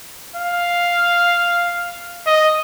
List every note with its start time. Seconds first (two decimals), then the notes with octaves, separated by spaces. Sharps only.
0.36 F5
2.27 D#5